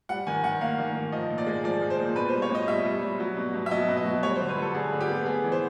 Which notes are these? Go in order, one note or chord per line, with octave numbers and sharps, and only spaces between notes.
G3 F#5
D#3 G#5
D#3 F#5
A#3 F5
D#3
D#3
F3 D#5
A#2
D5
G#3
F3 D5
F3
C5
A#2
B2 B4
G3 C5
C#5
B2 D#5
G3 E5
G3
G3
F#3
B2
B2
E5
F#3 D#5
B2
D#5
F#3
G3 C#5
D3 C5
B4
G3 A4
D3 G#4
D3
G4
B3
B3 G#4
E3
C5